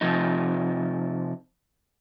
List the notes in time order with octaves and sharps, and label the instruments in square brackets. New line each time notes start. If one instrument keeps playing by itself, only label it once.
[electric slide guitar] C3 F3 D#4